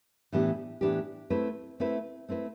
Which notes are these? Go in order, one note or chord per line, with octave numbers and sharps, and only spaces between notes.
A2 E3 B3 D4 G4
A2 E3 B3 D4 G4
A3 C4 E4 B4
A3 C4 E4 B4
A3 C4 E4 B4